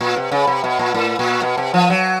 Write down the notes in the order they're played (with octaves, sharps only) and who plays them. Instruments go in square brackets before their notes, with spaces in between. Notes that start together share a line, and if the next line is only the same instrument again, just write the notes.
[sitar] A#2
C3
C#3
C3
B2
A#2
A2
A#2
B2
C3
F3
F#3